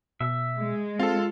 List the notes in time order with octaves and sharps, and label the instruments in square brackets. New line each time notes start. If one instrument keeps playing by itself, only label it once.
[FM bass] B2 [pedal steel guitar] E5
[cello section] G#3
[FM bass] C4 [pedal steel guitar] F4 [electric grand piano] A4 F5